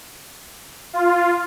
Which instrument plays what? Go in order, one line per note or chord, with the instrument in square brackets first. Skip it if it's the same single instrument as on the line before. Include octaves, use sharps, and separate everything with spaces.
[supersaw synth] F4